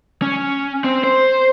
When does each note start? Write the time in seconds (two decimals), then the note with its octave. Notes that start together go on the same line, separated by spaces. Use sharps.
0.22 C#4
0.84 C4
1.04 C5